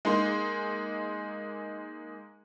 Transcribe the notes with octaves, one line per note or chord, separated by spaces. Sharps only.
G#3 A#3 D#4 C6